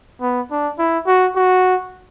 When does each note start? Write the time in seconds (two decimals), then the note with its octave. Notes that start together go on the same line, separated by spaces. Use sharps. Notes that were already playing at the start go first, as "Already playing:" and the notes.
0.21 B3
0.51 D4
0.79 E4
1.07 F#4
1.36 F#4